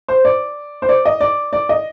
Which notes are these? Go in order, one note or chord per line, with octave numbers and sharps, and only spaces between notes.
C5
D5
C5
D5
D#5
D5
D5
D#5